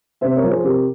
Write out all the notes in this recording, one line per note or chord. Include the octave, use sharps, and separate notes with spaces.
C3 C5 E5
A#4 C#5
F3
G#4 C5
C3 G4 A#4